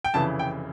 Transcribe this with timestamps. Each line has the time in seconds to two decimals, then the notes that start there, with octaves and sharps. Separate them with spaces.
0.04 G5
0.14 F1 F2 C#3 E3 A5
0.39 G5